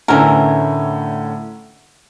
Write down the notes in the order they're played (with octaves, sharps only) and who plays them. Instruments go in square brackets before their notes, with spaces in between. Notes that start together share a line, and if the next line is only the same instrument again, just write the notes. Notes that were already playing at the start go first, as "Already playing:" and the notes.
[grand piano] A2 D3 C#4 [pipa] E3 A#4